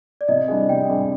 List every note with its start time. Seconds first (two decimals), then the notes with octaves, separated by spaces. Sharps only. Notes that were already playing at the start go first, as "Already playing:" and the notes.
0.21 D5
0.28 C3 D#5
0.48 G3 D4 G#4
0.69 C3 G5
0.89 G3 D4 G#4